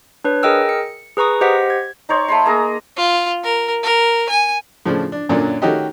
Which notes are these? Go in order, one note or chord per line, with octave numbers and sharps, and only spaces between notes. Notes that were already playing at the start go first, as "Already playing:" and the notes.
D4 B4 C#5
G#4 A#4 D#5 G5 E6 F6
C#7
G#4 B4 A#5 C#6 D#6
G4 C5 D#5 F#5 B6
G#6
D#4 C5 C#5
A3 B5 C6
A#3 G#4 A#5
F4
A#4
A#4
G#5
A2 C#3 F3 D4
D4
F#2 A#2 D3 F#3 C#4 D4
D#3 A3 C#4 F#4 G4 D#5